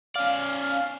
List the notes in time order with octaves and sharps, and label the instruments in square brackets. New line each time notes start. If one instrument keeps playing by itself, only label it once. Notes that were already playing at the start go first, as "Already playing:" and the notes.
[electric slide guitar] C#4 D5 [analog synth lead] F5